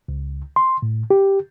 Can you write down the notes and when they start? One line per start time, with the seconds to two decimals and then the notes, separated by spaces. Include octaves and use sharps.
0.09 C#2
0.56 C6
0.82 A2
1.10 G4